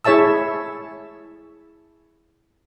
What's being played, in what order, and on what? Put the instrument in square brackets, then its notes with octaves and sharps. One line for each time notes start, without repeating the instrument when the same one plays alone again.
[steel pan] E4 G#4 C#5 E5 A5 E6